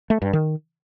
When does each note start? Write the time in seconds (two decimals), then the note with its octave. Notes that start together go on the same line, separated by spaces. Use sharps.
0.10 A3
0.22 G2
0.33 D#3